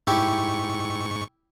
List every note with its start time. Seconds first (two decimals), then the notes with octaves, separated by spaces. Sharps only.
0.07 G#2 E4 G4 C#6